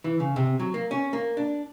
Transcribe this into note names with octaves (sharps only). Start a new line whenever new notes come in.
E3
C#3
C3
F#3
A#3
C#4
A#3
D4